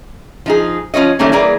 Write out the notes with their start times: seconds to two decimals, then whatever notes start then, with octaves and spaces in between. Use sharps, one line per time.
0.46 F3 D#4 G#4
0.94 F3 C#4 F4 C#5 D#5
1.19 D#3 E3 G3 A3 A#3 C#4
1.32 E3 G3 A#3 G#4 A#4 D5